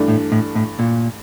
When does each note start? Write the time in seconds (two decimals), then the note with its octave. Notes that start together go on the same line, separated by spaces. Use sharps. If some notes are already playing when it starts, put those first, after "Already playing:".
Already playing: G2 E3 A3 D4
0.08 A2
0.32 A2
0.55 A2
0.79 A#2